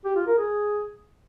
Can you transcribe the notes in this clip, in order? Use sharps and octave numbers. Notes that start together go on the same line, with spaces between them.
G4
F4
A#4
G#4